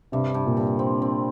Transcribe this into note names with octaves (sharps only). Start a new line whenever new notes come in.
G2 C3
G2
A#2
G2
C4
C4